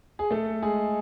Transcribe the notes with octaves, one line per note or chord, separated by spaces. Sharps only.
G#4
A3 A4
G#3 G#4